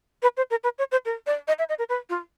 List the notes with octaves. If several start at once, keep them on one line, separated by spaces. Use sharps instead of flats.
B4
C5
A#4
B4
C#5
C5
A#4
D5
D#5
E5
D#5
A#4
B4
F4